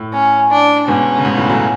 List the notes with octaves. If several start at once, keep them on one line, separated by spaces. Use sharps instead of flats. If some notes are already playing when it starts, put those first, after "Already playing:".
Already playing: A2
C#4
D4
G#2 B2 C#4
C#3
G#2 B2
A2 C#3
F#3 A3